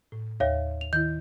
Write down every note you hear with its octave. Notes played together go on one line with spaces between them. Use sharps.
A2
D#2 C#5 E5 F5
F7
D#3 E4 G6